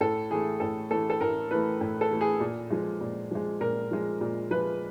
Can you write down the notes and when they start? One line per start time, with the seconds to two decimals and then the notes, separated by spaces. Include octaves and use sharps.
0.01 A2 A4
0.30 E3 A3 G#4
0.60 A2 A4
0.91 E3 A3 A4
1.10 A4
1.21 A2 A#4
1.51 E3 A3 B4
1.81 A2
2.01 A4
2.11 E3 A3
2.21 G#4
2.40 A#2
2.71 F3 G#3
3.01 A#2
3.31 F3 G#3
3.61 A#2 A#4
3.91 F3 G#3
4.21 A#2
4.51 F3 G#3 B4